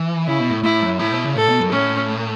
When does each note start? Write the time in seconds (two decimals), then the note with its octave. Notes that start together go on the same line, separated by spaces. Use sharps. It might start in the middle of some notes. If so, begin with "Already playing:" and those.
Already playing: E3
0.26 C#3 E4
0.39 B2
0.51 A2
0.63 A2 E4
0.82 F#2
0.99 A2 E4
1.12 B2
1.24 C#3
1.35 A2 A4
1.49 B2
1.60 F#2
1.72 A2 C#4